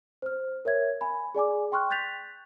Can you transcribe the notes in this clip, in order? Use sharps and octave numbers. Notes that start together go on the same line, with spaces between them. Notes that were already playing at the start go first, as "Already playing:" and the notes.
C5 F6
A#4 C#5 E5 G#6
G#5 B5
G#4 D5 G#5 D6
G5 C6 C#6 F6 F#6
F#6 G6 A6 B6 F7